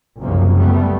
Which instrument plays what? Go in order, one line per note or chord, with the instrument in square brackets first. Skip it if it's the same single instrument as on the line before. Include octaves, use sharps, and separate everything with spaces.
[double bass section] F#1 C2 F#2 C3 F3 A#3
G3 A3 B3